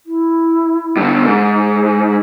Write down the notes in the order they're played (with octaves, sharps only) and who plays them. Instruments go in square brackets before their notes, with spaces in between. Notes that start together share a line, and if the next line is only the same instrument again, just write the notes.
[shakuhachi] E4
[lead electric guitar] G2 D3
[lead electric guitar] G#2 [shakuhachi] G#4